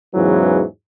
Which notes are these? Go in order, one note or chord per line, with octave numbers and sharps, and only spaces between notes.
E2 G#2 C#3 E3 F#3